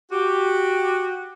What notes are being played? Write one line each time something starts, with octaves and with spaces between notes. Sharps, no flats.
F#4 G4